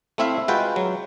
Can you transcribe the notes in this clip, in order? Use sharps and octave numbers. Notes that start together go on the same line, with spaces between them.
A3 C4 E4 E5 F5
G#3 F4 F#4 B4 G5
F#3